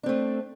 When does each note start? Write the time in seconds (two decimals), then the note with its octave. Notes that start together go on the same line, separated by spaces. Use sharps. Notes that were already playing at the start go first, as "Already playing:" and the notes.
0.03 D4
0.06 C4
0.09 A3